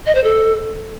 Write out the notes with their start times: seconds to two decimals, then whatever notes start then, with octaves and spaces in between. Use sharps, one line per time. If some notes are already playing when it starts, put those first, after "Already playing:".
0.06 D#5
0.15 C5
0.24 A4